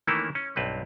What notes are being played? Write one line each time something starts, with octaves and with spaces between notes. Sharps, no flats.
D#3 E3 A3 A#3 C#4 E4
C#4
B1 G2 C4 B4